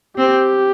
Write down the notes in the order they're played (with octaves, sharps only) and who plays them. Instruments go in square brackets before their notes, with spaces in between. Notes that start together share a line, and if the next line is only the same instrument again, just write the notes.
[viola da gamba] C4 [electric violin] G4